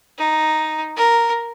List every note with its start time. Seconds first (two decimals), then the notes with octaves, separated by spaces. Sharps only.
0.18 D#4
0.97 A#4